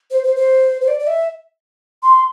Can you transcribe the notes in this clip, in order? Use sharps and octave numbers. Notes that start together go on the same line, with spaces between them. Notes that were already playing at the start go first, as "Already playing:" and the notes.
C5
C5
C5
C5
D5
D5
E5
C6